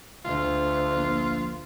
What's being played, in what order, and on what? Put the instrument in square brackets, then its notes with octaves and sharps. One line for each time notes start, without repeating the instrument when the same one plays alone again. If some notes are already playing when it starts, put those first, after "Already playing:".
[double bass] D2 [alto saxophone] F4
[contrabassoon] A#1